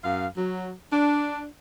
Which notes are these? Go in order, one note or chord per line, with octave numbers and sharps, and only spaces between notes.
F#2 F5
F#3
D4